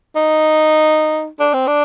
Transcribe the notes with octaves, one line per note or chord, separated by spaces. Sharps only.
D#4
D4
C4
D4